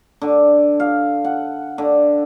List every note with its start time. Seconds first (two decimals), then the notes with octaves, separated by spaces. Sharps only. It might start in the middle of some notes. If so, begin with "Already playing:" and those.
0.21 D3
0.80 F5
1.24 F#5
1.78 D3